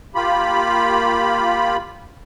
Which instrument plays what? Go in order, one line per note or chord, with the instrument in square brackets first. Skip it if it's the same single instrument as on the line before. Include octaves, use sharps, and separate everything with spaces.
[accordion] A#3 F4 G4 B5